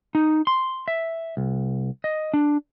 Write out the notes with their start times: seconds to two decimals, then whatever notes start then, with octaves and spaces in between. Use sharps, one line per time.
0.15 D#4
0.47 C6
0.88 E5
1.37 C2
2.04 D#5
2.34 D4